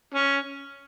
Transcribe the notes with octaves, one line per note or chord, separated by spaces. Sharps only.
C#4